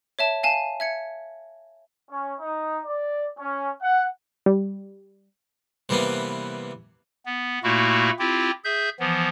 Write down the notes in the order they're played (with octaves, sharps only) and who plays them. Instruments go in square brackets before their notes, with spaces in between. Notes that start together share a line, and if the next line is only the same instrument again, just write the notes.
[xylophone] C#5 E5 A5
F5 G#5 A5
E5 G#6 C#7
[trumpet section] C#4
D#4
D5
C#4
F#5
[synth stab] G3
[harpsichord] C3 E3 G3 A#3 B3
[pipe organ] B3
A#2 A3 A#3 E4 F#4
C4 E4 F4 G4
G#4 E5 G6
E3 F3 B3